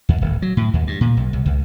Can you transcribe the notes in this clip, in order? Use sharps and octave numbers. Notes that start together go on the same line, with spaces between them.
D#2
D1
F#3
A2
D#2
G2
A#2
B1
C2
C#2